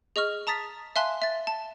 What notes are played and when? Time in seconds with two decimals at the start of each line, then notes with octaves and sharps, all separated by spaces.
0.16 G#4 D#5 C#6 F6
0.47 A5 A#5 D#6 A6 B6
0.96 E5 F5 G#5 A5 C6 F#6
1.22 E5 A6
1.47 A5